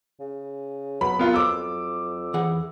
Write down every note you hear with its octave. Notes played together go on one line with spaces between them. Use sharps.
C#3
F#3 B3 B5
B3 F4 A#4
F2 D6 E6
E3 G#4 F#5